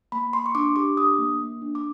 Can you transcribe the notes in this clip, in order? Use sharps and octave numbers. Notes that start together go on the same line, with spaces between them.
A#3 B5
A#3 C6
C#6
D4 D6
G4 D6
D4 D#6
A#3
A#3
D4
D6